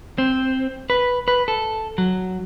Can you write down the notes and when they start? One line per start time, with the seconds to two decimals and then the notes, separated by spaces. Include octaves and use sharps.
0.18 C4
0.90 B4
1.28 B4
1.48 A4
1.98 F#3